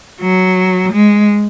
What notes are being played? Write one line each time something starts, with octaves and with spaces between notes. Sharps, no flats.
F#3
G#3